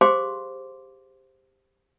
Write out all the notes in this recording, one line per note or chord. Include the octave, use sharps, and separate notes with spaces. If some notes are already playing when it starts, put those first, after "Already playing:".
G4 G#4 C5 F5 C6 D6